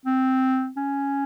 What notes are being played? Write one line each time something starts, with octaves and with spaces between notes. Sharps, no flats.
C4
C#4